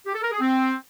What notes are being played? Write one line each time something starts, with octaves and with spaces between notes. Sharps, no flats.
G4
A4
A#4
G#4
C4